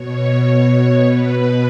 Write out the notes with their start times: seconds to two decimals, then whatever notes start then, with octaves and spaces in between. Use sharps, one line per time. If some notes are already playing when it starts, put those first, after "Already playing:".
Already playing: B2 C#5
1.05 B2 B4